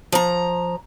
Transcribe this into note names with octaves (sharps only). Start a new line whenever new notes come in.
F3 A#5